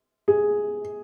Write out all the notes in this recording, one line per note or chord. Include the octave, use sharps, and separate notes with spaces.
G#4